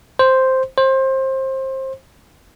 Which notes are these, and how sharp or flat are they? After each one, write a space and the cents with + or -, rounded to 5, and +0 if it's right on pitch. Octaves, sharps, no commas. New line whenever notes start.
C5 +0
C5 +25